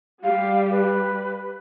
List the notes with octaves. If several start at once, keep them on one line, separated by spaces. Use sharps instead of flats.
G3 G4 F5
B4